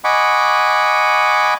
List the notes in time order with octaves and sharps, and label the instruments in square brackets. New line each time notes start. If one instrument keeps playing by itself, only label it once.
[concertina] D#5 F#5 G#5 B5 C#6 D6